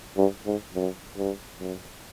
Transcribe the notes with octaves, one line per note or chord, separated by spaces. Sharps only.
G2
G#2
F#2
G2
F#2